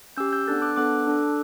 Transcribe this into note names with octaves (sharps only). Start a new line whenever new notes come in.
C#4 G4 E6 G6
E6 G6
B3 D4 A4 F#6 A6
D6 F#6
B3 D4 A4 D6 F#6
D4 A4